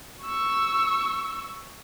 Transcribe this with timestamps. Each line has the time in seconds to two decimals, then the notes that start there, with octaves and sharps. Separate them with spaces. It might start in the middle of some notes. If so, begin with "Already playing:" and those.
0.24 C#6 E6